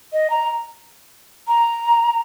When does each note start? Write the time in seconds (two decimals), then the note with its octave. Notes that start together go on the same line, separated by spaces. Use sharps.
0.13 D#5
0.30 A#5
1.48 A#5